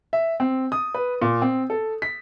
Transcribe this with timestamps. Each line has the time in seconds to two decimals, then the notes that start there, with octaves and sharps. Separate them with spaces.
0.13 E5
0.40 C4
0.72 D#6
0.94 B4
1.22 A#2
1.42 C4
1.70 A4
2.02 B6